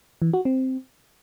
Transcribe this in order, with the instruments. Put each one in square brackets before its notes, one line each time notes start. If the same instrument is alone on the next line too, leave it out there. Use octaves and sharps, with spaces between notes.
[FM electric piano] E3
F#4
C4